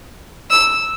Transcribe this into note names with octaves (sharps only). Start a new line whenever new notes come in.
E6